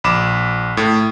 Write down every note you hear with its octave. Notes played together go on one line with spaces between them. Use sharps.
A#1 B5 D6 E7
A2